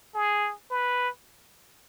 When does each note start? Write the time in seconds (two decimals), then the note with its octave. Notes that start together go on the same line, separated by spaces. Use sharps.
0.15 G#4
0.70 B4